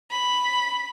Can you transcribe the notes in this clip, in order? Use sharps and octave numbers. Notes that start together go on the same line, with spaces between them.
B5